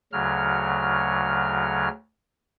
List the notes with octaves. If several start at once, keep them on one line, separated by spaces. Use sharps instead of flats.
D2 C#3 F#3 F6